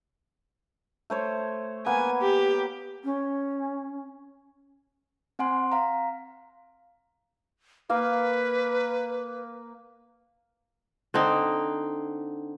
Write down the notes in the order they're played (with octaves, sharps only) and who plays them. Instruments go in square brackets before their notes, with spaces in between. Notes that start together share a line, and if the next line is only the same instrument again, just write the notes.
[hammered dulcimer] A3 C5 C#5
[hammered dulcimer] A#3 B3 [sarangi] G#5
[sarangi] G4
[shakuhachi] C#4
[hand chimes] C4 F#5 G#5 C6
F5 A#5
[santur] A#3 A#4 F5 [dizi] B4
[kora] D3 C4 D#4